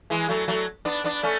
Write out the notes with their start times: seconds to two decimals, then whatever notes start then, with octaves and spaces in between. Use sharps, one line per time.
0.10 E3 G#3
0.29 F#3 A3
0.48 F#3 A3
0.85 B3 D4
1.04 B3 D4
1.23 A3 C#4